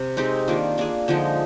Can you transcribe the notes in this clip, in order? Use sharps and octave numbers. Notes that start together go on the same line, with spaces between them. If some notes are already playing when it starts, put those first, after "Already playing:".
Already playing: C3
G#3 C4 D#4 G4
D#3 A#3 D4 F4
A#3 D4 G#4
D3 F3 G#3 D#4